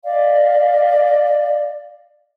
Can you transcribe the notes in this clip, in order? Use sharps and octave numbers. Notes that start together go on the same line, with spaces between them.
D5 D#5 F5